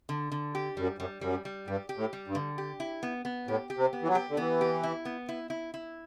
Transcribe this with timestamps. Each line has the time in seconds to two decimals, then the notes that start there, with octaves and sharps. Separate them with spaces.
0.09 D3
0.32 D3
0.55 G4
0.77 F#2 G3
0.98 F#2 G3
1.21 F#2 G3
1.45 G3
1.67 G2 G4
1.89 G4
1.97 A2
2.13 G3
2.27 G2
2.35 D3
2.58 G4
2.80 E4
3.03 B3
3.25 B3
3.47 A2 G4
3.70 G4
3.77 C3
3.93 B3
4.02 E3
4.08 F#3
4.15 G4
4.30 D3
4.37 E3 B3
4.61 G4
4.83 E4
5.05 B3
5.29 E4
5.50 E4
5.74 E4